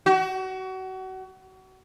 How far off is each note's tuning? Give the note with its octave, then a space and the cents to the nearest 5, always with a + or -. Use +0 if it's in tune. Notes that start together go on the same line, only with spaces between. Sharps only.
F#4 +30